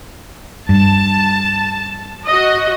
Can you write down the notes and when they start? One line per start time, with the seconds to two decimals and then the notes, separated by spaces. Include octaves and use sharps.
0.69 G2 A5
2.26 F#4 D#5